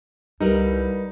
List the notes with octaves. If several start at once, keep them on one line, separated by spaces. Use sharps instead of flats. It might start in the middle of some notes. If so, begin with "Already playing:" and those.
C2 G3 D#4 A#4 B4